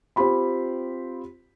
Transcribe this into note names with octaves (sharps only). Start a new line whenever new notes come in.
C4 F4 G4 B5 C6